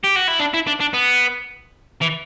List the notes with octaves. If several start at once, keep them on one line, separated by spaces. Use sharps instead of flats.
G4
F#4
E4
D4
E4
D4
D4
B3
E3